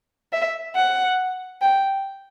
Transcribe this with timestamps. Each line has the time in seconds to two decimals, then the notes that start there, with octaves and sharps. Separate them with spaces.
0.33 E5
0.75 F#5
1.61 G5